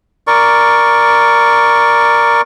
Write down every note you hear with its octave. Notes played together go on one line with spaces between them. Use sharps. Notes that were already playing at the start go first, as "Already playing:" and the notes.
A#4 D5 C#6